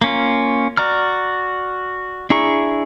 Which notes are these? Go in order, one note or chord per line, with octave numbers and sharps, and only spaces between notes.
A#3 C#4 F4
F#4 D5 A#5 F6
D4 E4 G#4 A#5 C#6